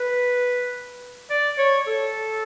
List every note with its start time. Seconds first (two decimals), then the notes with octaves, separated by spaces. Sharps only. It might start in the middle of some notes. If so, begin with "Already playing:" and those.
Already playing: B4
1.30 D5
1.58 C#5
1.87 A4